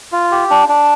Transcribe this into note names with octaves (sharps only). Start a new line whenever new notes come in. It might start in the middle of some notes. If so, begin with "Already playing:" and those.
F4
G4
D4
D4